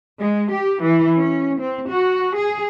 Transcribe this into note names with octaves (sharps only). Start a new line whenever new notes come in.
G#3
G4
E3
C#4
C4
F#4
G#4